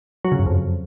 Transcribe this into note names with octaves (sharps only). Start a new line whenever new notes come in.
F#3
C#3
F#2
F2